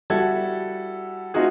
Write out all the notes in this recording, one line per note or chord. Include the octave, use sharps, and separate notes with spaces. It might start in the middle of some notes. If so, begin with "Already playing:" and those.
G3 E4 F#4 A4 F#5 G#6
A3 C4 D#4 F4 F#4 G#4